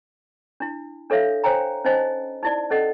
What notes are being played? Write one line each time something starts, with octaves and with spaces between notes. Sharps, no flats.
D4 E4
D4 A4 C#5 E5 F5
C5 C#5 G5 G#5 A#5
C#4 D#4 C5 D#5 G#5
D#4 E4 D5
C#4 A4 D#5 F#5